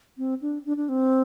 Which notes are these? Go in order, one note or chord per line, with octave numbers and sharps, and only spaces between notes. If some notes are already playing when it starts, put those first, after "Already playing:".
C4
D4
D4
D4
C4